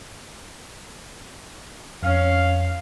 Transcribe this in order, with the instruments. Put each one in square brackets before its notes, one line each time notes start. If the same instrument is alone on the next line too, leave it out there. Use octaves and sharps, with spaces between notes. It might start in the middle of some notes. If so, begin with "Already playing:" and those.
[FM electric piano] F2 [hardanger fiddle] C#4 [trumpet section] F5